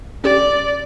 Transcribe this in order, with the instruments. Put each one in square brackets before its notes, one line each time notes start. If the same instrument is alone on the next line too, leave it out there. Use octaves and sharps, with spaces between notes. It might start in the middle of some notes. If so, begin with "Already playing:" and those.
[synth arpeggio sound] C#4 G4 [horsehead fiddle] D5